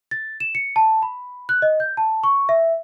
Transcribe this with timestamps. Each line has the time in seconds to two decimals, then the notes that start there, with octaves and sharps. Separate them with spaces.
0.11 A6
0.40 E7
0.55 C#7
0.76 A5
1.02 B5
1.49 F#6
1.62 D#5
1.80 G6
1.97 A5
2.24 C#6
2.49 E5